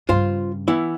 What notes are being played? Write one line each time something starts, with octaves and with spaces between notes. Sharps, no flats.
G2 C#3 F4 C5 F5
E3 B3 E4